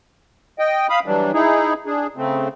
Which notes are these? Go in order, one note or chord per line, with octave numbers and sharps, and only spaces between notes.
D#5 G5
F5 B5 D#6
E3 F#3 G3 D4
D#4 E4 G#4
D4 G#4
C#3 A3 C4